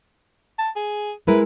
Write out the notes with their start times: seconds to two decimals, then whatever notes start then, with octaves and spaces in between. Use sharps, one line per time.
0.58 A5
0.76 G#4
1.27 G#3 E4 A#4 B4